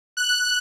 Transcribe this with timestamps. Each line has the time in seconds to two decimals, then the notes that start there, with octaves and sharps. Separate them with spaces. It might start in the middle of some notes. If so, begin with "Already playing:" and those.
0.17 F#6